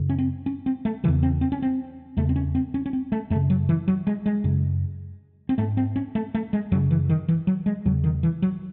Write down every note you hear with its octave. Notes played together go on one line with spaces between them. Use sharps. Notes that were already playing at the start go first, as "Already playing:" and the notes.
Already playing: F#2 C#3
C#4
C4
C#4
C4
A3
E2 C#3 E3
C4
C4
C#4
C4
E2 C#3 A3
C4
C#4
C4
C#4
C#4
C4
A3
F#2 A3
C#3
F#3
E3
F#3
G#3
G#3
F#2 C#3
C4
G#2 A3
C4
C#4
A3
A3
G#3
F#2 C#3 F#3
E3
D#3
E3
F#3
G#3
E2 C#3 F#3
D#3
E3
F#3